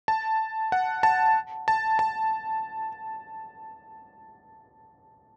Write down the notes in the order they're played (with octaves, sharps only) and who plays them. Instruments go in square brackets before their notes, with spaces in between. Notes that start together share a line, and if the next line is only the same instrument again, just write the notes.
[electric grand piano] A5
F#5
A5
A5
A5